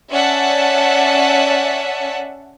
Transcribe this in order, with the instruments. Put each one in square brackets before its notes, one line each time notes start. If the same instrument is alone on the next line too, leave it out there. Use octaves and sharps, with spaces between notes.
[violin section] C#4 D5 E5 F#5 A5